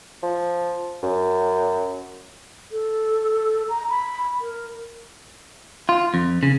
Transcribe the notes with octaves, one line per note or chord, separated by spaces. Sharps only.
F3
F#2
A4
A#5
B5
A#4
F4
F2
C#3